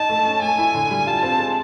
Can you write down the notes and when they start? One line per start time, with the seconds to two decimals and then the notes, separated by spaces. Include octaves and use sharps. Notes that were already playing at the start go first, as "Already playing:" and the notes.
Already playing: D#4 A5
0.10 A3
0.26 C#4
0.42 A3 G#5
0.58 E4
0.75 D3
0.91 G3
1.07 F4 A5
1.23 C4
1.39 G#3